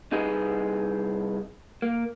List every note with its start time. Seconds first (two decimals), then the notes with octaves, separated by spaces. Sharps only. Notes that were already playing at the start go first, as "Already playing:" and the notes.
0.12 C2 D#4 G#4 B4 D#5
1.82 A#3